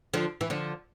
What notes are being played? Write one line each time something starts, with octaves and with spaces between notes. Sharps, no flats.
D3 F3
E3
D3 F3